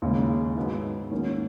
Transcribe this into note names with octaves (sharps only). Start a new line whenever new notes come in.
D#2 C#3 G#3
G#2 F#3 B3 D#4
G#2 D#3 F#3 A#3 C#4